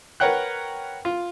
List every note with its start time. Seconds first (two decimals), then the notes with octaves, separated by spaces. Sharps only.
0.20 A#4 B4 C#5 F#5 G5 F#6
1.05 F4